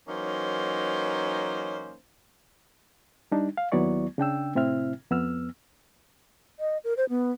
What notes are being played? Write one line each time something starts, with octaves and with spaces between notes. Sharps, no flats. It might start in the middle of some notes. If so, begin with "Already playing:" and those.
E3 F#3 A#3 C#4 D#4 C5
G3 D4 D#4
F5
D#2 F#3 B3 E4 D5 C#6
C#3 D4 G5 E6
A2 C3 C4 E4 E5 F6
F2 B3 E6 F6
D#5
A#4
C5
B3